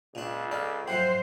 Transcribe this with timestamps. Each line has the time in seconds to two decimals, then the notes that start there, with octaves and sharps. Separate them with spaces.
0.15 C#2 A#2 D4
0.51 A4 D5 G#5 F6
0.88 F3 F#3 E4 C5 F#5 G5